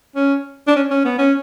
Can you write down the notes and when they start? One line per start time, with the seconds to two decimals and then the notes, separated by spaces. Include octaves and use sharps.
0.16 C#4
0.67 D4
0.76 C#4
0.91 C#4
1.05 B3
1.18 C#4